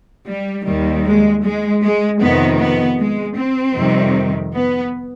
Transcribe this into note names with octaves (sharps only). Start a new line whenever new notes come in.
G3
D#2 D#3 G3
G#3
G#3
G#3
F2 C3 D#3 B3
B3
G#3
C4
F2 C3 D#3 G3
B3